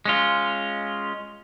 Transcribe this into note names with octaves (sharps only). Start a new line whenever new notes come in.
G#3 C#4 F4